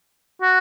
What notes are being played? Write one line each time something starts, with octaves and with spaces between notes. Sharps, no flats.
F#4